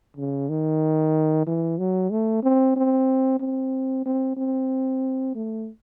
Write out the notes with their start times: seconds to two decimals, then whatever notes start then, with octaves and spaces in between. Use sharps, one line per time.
0.17 C#3
0.49 D#3
1.47 E3
1.78 F#3
2.10 A3
2.43 C4
2.76 C4
3.40 C4
4.06 C4
4.37 C4
5.35 A3